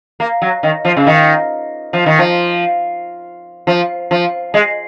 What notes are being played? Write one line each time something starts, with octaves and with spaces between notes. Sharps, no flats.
A#3
F#3
D#3
F3
C#3
D#3
F3
D#3
F3
F3
F3
G#3